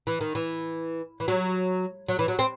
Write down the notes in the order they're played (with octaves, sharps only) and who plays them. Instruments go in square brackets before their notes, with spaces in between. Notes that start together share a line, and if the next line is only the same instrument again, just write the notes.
[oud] E3
D#3
E3
E3
F#3
F#3
E3
F#3
C4